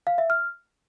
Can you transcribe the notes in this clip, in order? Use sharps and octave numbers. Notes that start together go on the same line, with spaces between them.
F5
E5
F6